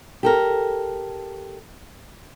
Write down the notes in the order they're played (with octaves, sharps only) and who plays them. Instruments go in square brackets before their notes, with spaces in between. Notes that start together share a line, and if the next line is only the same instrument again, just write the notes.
[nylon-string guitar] G4 A4 A#4